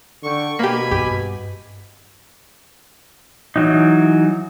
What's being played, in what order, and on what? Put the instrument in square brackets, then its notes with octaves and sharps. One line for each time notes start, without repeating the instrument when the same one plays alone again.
[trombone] D3 [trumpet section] G5 C#6
[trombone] B2 [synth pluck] A#3 G4 [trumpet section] G#5 B5
[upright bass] G2 [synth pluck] G4
[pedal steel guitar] E3 F#3 D#4